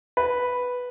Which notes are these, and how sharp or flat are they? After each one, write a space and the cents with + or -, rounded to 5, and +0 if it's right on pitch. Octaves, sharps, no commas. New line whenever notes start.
B4 +0